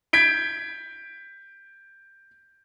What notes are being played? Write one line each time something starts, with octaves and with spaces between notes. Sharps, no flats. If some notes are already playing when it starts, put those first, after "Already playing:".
G6 G#6 B6 D7 G7